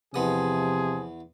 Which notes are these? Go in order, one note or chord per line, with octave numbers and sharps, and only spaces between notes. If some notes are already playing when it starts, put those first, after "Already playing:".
E2 C3 F3 B3 G#4 D#6